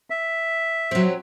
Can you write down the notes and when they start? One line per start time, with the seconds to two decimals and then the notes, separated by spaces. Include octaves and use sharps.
0.10 E5
0.91 F#3 C4